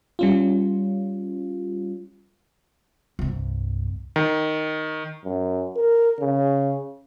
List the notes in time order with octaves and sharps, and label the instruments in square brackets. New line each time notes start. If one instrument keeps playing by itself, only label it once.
[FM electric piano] G3 C#4 F4
[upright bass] C2 G2
[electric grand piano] D#3
[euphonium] F#2
A#4
C#3